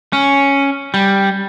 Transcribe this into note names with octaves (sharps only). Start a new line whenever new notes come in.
C#4
G3